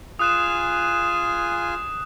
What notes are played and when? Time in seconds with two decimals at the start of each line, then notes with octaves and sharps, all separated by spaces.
0.19 F4 G#4 G#5 D#6 F#6 E7